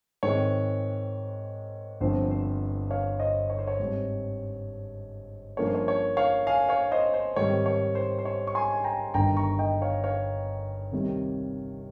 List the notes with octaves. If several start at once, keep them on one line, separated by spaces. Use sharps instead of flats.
G#2 D#3 G#3 C4 C#5
G1 G2 F3 C4 C5
C5
C#5 F5
C5 D#5
C#5
C5
C#5
G#2 G3 C4
G2 F3 A#3 C#4 C#5
C5
C#5
C#5
C#5 F5
F5 G#5
C#5 F5
C5 D#5
C5
G#2 D#3 G3 C4 C#5
C#5
C5
C5
C#5
C#6
G#5 C6
G#5
G5 A#5
G1 G2 D#3 G5 A#5
A#5 C#6
D#5 G5
C#5 F5
C#5 F5
C2 C3 D#3 G3